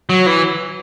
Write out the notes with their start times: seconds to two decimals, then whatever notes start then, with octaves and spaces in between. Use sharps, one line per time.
0.10 F#3
0.26 E3